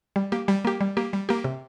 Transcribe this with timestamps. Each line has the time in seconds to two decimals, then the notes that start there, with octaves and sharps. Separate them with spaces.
0.16 G3
0.32 A#3 G4
0.48 G3
0.65 A#3 G4
0.81 G3
0.97 A#3 G4
1.13 G3
1.29 A#3 G4
1.44 C3